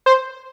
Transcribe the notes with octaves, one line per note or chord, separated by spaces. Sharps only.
C5